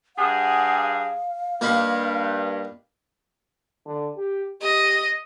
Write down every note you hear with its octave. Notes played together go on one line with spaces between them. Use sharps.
G2 G#4 F#5
F5
G2 A#3 D#4 B5
D3
G4
G4 D#5